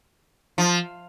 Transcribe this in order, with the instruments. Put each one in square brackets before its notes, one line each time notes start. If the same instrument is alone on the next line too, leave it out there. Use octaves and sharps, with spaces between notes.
[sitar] F3